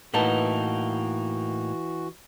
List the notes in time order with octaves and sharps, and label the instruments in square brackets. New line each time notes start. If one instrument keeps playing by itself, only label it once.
[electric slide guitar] A2 A#3 D#4 [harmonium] E3 F#4 [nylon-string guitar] B4 F#5 A5